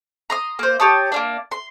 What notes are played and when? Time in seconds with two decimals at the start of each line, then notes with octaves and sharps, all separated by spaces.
0.30 A#5 C6 D#6
0.59 A#3 C5
0.80 G4 C#5 A5 D#6
1.12 A#3 C#4 D4
1.52 C6